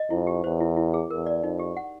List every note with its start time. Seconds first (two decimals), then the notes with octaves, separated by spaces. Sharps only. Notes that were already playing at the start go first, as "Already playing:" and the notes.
Already playing: D#5
0.10 F2 E4
0.27 G4
0.44 E2 C5
0.60 E4
0.77 E4
0.94 G#4
1.10 E2 A#4
1.26 D5
1.43 F2 D#4
1.59 G4
1.77 F#5